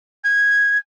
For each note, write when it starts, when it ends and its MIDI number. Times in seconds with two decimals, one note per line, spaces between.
0.24 0.78 92